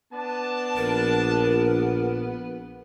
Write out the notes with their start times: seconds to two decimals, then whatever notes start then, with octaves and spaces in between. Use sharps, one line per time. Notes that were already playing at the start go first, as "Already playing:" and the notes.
0.12 B3 D4 A5
0.77 A#1 A#4